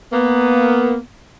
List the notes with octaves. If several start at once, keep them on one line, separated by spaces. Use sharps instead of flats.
A#3 B3